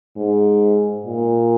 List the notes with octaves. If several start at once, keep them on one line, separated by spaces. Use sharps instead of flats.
G#2
A#2